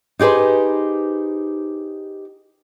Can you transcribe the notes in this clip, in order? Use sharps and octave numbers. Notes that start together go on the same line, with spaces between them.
D#4 G4 G#4 B4 C5